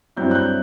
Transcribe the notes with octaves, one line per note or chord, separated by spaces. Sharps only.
G2 F#3 C4 E4 G6
F#6
G6